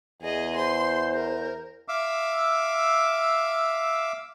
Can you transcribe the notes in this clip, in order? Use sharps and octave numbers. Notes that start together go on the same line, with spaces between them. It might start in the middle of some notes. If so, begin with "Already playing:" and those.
E2 G#4 D#5
C5 C6
A#4
E5 F5 D6 E6